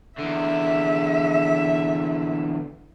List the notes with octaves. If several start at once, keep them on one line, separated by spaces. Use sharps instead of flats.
E2 D3 E5